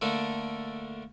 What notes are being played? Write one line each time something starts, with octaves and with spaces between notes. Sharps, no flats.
D3 A3 A#3 D4